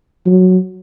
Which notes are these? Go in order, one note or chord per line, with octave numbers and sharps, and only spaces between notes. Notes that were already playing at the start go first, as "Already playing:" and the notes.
F#3